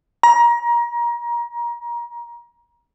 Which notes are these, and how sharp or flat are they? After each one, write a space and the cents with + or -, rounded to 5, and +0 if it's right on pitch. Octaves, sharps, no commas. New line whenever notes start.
A#5 +25